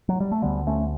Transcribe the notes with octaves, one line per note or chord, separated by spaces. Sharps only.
F#3
G3
A3
D2 D3 G3 B3
A3 C#4